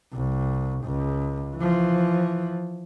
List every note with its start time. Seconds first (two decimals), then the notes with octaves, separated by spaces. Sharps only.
0.14 C2
0.85 C#2
1.57 E3 F3